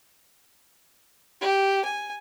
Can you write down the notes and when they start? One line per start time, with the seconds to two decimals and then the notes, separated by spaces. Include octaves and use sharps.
1.41 G4
1.85 G#5